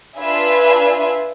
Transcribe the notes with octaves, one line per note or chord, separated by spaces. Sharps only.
D4 F4 B4 E5 G#5